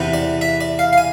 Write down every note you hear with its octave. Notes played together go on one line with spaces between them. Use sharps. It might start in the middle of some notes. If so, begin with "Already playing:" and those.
Already playing: E2 C3 E3 B3
D5
E5
D5
F5
F5
G#5